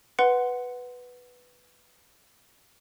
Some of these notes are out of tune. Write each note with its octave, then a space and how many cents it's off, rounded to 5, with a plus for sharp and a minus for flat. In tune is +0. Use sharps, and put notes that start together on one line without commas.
B4 +0 F#5 +0 C6 -10